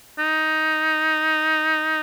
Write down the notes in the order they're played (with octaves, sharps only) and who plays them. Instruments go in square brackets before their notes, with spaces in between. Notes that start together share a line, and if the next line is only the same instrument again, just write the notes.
[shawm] D#4